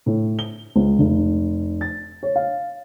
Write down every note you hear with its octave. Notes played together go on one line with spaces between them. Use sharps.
A2
G7
C#2
F1
A6
C#5
F5